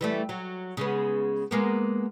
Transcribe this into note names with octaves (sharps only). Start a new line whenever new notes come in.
E3 G3 A3
F#3
C#3 G#3 B3
G#3 A#3 B3